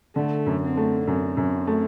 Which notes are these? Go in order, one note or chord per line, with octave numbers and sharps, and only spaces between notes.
D3 A3
F#2
C4
A3
F#2 C4
F#2
A3